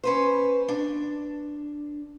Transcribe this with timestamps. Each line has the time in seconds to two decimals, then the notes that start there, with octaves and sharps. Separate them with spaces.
0.04 C#4 B4 C5
0.68 D4